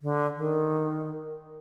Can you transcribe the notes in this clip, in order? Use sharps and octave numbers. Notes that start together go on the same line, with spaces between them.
D3
D#3